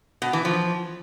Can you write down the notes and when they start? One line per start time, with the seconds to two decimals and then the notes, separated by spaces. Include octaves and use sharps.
0.22 B2
0.33 E3
0.45 F3